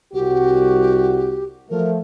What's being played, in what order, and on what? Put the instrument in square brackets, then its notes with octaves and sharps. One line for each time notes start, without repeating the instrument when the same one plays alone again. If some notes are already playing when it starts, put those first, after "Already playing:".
[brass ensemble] C2 F#4 [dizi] G4
[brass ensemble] F3 A3 [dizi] A#4